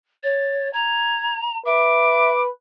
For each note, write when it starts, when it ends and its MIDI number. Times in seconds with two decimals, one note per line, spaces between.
0.23 0.70 73
0.23 0.68 93
0.73 1.58 82
0.73 1.35 92
1.65 2.50 71
1.65 2.30 76
1.65 2.41 86